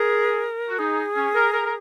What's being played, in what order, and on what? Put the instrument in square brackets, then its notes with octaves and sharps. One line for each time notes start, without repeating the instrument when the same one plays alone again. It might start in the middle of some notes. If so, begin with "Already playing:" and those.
Already playing: [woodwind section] G#4 [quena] A#4
[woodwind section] F#4
[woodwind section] D#4 [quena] G#4
[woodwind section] C#4
A#4
A#4
A#4